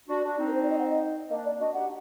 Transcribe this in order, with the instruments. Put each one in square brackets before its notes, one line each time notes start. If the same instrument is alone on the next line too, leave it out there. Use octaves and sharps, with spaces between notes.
[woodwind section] D4 F#4
D4 F#4
C4 D#4
[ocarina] A#4
C5
D5
D#5
F#5
D#5
[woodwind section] A#3 D4 [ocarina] D#5
[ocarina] D5
[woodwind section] D4 F#4 [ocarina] D#5
[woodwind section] D#4 G4 [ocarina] F#5